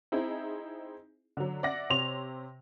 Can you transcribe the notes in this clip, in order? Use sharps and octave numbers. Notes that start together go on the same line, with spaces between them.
C4 D#4 E4 G#4
D3 F#3
D5 E5 F#5 A#6
C3 C#5 C6 F7